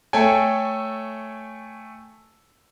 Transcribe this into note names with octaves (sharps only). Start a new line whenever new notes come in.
A3 A4 C#5 G5 G#5